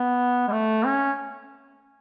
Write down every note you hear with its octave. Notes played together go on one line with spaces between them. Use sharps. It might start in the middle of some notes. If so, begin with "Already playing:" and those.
Already playing: B3
G#3
A3
C#4